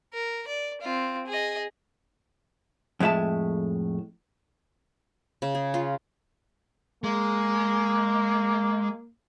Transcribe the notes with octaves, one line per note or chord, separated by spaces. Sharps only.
A#4
D5
C4 F4
G#4 D#5
F2 A2 G#3 E5 A5
C#3
G#4
F4
G#3 A#3